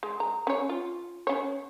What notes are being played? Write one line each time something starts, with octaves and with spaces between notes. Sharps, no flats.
G#3
A#5
C#4 C#5
F4
C#4 C#5